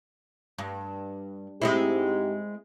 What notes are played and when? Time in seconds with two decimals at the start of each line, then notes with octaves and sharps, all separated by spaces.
0.58 G2
1.62 G#2 G#3 C4 E4 G4